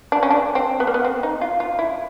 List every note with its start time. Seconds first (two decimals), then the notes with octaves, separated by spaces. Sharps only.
0.12 D4
0.23 C#4
0.30 D4
0.55 C4
0.80 B3
0.87 A#3
0.94 B3
1.05 C4
1.23 D#4
1.41 F4
1.60 F4
1.79 E4